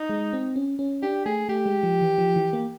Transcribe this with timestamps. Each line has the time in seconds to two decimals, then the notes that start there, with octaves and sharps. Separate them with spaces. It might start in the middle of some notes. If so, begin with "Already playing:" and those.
Already playing: D#4
0.09 G#3
0.33 C4
0.56 C#4
0.79 C#4
1.03 D4 G4
1.26 A3 G#4
1.49 A3 G4
1.66 G#3
1.83 F3
2.01 E3
2.18 F3
2.36 E3
2.53 A#3